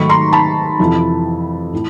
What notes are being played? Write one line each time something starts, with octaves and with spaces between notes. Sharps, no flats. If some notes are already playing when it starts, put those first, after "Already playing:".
Already playing: G#2 D#3 F#3 A3 B5 C#6
A#5 C6
A5 B5
F2 C3 E3
A2